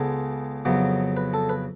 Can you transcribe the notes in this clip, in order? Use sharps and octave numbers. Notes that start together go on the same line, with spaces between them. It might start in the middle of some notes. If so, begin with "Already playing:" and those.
Already playing: C#2 C#3 G#3 B3 A4
F2 C#3 F#3 B3
B4
A4
B4